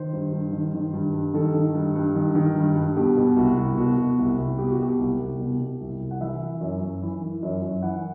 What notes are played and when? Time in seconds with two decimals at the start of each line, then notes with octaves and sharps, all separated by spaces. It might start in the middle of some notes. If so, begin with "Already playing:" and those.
Already playing: D#3 C5
0.13 G2
0.32 G2
0.52 D#3
0.74 D#3
0.93 G2
1.13 G2
1.34 D#3 A4
1.54 D#3
1.75 G2
1.95 G2
2.15 D#3
2.35 D#3
2.56 G2
2.76 G2
2.96 B2 G4
3.17 B2
3.36 C2 F#4
3.57 C2
3.77 B2 F#4
3.97 B2
4.18 C2
4.38 C2
4.58 B2 G4
4.71 F#4
4.79 B2 G4
4.99 C2
5.20 C2
5.39 B2
5.60 B2
5.80 C2
6.00 C2
6.11 F#5
6.20 E3 E5
6.42 E3
6.61 F#2
6.81 F#2
7.02 E3
7.22 E3
7.43 F#2
7.63 F#2
7.82 E3 F#5